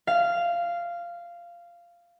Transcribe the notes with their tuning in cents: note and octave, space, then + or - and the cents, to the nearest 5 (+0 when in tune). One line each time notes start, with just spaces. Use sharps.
F5 -10